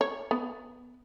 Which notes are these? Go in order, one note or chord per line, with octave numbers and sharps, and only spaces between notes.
C#5
B3